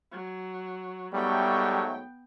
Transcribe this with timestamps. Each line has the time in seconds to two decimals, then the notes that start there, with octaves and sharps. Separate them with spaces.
0.12 F#3
1.14 G#2 F#3 G3 A3 B3 G5